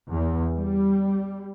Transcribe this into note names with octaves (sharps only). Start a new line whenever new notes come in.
E2
G3